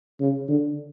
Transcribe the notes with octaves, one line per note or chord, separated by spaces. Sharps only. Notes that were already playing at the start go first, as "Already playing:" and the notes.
C#3
D3